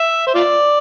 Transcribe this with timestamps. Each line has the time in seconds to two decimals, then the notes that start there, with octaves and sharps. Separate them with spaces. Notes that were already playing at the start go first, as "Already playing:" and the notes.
Already playing: E5
0.27 C5
0.34 F4 D5